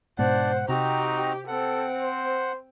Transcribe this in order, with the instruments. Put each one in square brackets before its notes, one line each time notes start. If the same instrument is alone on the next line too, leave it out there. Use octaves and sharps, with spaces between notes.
[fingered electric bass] G#2 B2 [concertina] D4 D5 [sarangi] C5 [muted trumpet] F#5
[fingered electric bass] C3 [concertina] C4 F#4 A#5 [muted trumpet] D#4 [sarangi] G4
[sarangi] C4 [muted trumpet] A4 [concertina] F#5
[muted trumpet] C5